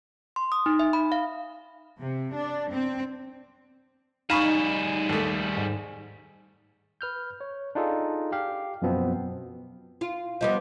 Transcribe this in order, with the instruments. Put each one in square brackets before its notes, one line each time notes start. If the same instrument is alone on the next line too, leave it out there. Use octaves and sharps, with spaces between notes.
[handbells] C6
D#6
D#4
E5
B5
F5
[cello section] C3
D4
C4
[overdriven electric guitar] G3 G#4 [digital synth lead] D#4 [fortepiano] F5 B5 C#6 [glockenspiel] E7
[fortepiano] D#2 A3
[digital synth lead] G#2
[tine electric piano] B4 F6 G6
C#5
D4 D#4 F4 G#4 A4
G4 F5
F#2 B2 F3 B3 C4
[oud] F4
[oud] F3 G3 B3 [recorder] D#5